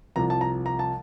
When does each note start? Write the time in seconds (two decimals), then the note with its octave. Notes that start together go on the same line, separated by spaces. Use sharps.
0.16 C2 C3 F3 A#5
0.30 A5
0.41 A#5
0.66 A#5
0.79 A5